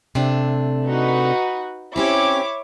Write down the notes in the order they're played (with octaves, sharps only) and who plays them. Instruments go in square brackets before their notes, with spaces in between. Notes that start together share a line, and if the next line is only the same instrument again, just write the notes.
[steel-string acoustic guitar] C3 A3 D4
[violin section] D#4 F#4 B4
[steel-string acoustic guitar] C4 C#4 G4 [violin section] E4 C#5 D6